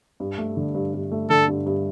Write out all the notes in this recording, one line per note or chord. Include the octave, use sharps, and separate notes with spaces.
G2
A3
D3
G2
G2
A3
D3 A4
G2
G2